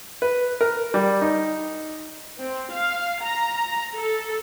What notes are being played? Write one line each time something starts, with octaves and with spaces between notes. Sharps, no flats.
B4
A#4
G3
D#4
C4
F5
A#5
A4